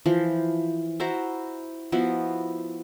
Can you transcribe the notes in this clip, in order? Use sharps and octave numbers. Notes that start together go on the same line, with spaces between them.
E3 F3
E4 F#4 C5 A#5
F3 B3 E4 F#4